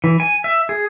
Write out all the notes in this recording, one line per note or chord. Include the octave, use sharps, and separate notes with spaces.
E3
G#5
E5
G#4